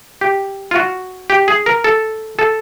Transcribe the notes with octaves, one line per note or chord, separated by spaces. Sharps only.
G4
F4
F#4
G4
G#4
A#4
A4
A4